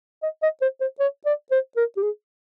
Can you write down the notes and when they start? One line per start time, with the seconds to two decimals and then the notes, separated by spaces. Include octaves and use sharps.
0.23 D#5
0.42 D#5
0.62 C5
0.81 C5
0.99 C#5
1.25 D5
1.51 C5
1.76 A#4
1.97 G4
2.02 G#4